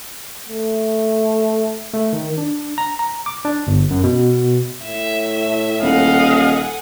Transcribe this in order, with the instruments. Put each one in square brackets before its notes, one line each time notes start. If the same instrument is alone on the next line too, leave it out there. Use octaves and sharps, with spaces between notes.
[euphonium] A3
[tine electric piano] A3
D#3
D4
A#5
A#5
D6
D4
G1
F#2
B2
[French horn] A2 [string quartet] E5
[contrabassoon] D#1 [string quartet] A4 F#5 G#5 [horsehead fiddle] D#5 F5